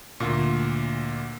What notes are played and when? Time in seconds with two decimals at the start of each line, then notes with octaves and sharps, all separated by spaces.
0.20 D2 A#2